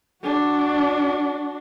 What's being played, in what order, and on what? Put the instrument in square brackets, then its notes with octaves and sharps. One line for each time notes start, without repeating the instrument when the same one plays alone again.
[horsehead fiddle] D4 F#4